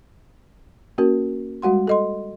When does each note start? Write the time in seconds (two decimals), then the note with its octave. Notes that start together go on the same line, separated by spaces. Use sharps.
0.98 A#3 C#4 F#4 A#4
1.62 G3 G#3 F#4 F#5 C6
1.87 A4 D#5 C6